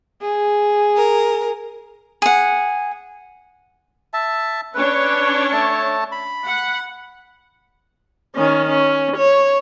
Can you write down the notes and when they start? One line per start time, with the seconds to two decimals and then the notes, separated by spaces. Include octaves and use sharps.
0.22 G#4
0.96 A#4
2.22 G#4 F#5
4.14 E5 A5
4.75 C#4 D4 B4 C#5
5.52 A3 A5
6.12 B5
6.47 F#5
8.35 D#3 C#4
8.70 C#4
9.17 C#5